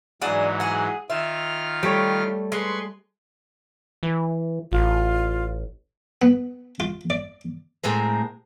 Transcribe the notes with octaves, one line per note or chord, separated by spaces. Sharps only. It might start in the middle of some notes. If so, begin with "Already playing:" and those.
G#2 E3 F#3 D4 G#4 F#5
G#4 F#5
D#3 F4 E5 F6
G3 A3 G4 C#5
G#3 B4 C6 C#6
E3
A1 F4
B3
F4
D5
A2 G#3 C4 A#4